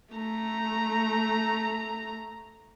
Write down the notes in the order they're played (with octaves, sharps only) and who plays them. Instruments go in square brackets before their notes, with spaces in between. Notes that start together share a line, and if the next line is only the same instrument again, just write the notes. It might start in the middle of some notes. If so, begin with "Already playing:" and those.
[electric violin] A3 A#5